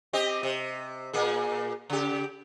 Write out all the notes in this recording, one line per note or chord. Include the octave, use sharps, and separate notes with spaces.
C4 G4 D#5
C3
A#2 A#3 G#4
C#3 G4